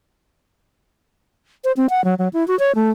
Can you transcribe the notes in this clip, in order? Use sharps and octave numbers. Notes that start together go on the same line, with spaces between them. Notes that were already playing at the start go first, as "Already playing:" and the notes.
C5
C4
F#5
F#3
F#3
E4
F#4
C#5
A3